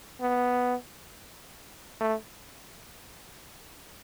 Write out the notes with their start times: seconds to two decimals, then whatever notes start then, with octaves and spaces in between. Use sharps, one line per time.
0.21 B3
2.01 A3